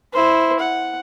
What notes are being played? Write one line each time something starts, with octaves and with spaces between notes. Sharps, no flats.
E4 C5
F#5